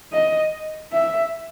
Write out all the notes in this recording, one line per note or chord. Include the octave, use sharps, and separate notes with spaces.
D#5
E5